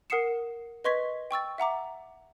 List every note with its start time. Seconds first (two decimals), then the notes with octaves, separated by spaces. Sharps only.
0.10 A#4 F#5 D#6 C7 C#7 E7
0.84 B4 D#5 C6 C#6 G#6 B6
1.31 G5 C#6 E6 A6
1.58 E5 F#5 A#5 D6